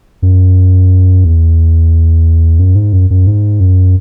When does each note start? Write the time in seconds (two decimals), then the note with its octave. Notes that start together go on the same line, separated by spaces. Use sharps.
0.22 F#2
1.24 E2
2.59 F#2
2.75 G#2
2.93 F#2
3.10 F#2
3.27 G#2
3.60 F#2